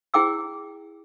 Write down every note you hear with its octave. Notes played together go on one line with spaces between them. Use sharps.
E4 G#4 G5 D6 E6